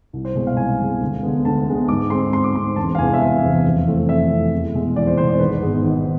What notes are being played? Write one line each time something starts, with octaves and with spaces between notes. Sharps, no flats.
C2
C5
B2 G#3
F5
C2 G#5
B2 G#3
D2
D3 G#3 B3
D2 A5
D3 G#3 B3
G#2 D6
G#3 C4 C6
G#2 C6
D6
G#3 C4 C6
E1 A5
F5
E2 C3 G#3 B3 G#5
E5
E1 F5
E2 C3 G#3 B3
F2
E3 A3 C4
F2 E5
E3 A3 C4
E2
B2 G#3
E2 D5
C5
B2 G#3 C5
D5
G#1 B4
G#2 G#3 B3
G#1